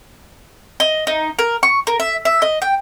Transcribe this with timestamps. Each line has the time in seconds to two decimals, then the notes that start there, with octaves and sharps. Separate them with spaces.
0.80 D#5
1.07 D#4
1.39 A#4
1.63 C#6
1.87 A#4
2.00 E5
2.25 E5
2.42 D#5
2.62 G5